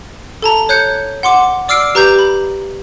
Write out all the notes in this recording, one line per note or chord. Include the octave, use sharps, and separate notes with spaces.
A4 A5 A#5
C#5 F#6 G6 C#7
F#5 C6 D6
D5 D6 E6 F6 C7 D7
G4 B4 A#5 D6 G6
B5